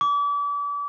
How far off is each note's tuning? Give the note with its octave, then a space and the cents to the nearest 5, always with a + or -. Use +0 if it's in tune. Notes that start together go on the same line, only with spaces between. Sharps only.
D6 -35